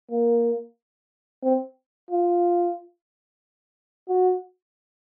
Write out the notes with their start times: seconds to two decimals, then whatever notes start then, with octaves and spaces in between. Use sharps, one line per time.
0.11 A#3
1.44 C4
2.11 F4
4.09 F#4